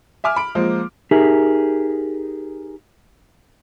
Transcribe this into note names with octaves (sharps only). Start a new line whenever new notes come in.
E5 G#5 D6 F6
B5 D7
F3 G#3 A#3
D#4 G4 G#4 A#4 E5